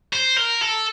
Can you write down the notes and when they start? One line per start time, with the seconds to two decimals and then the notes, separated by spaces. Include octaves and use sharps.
0.13 C5
0.37 A#4
0.61 A4